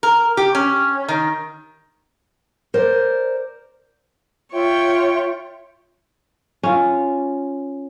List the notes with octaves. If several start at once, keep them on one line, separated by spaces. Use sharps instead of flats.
A#4
G4
C#4
D#3
A#4 C5 D5
F4 C#5 E5 G5
C#4 F4